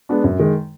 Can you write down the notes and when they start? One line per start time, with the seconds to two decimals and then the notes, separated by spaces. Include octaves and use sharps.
0.09 G#3 B3 D4
0.24 F#2
0.39 D#3 G#3